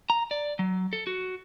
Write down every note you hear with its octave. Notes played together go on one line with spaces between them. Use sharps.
A#5
D5
F#3
A4
F#4